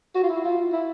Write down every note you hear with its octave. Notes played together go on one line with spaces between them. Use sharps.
F#4
F4
E4
F4
E4